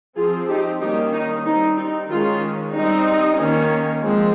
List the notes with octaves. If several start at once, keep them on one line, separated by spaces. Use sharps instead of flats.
F3 C4 F4 G#4
D#4 G4
D#3 G3 A#3 C#4 D#4 G4
D#4
G3 C4 D#4
D#4
D#3 G#3 C#4 F4
G3 C4 D#4
D#3 A#3 C#4
F3 G#3 C4